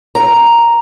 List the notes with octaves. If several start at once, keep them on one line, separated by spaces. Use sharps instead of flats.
A#5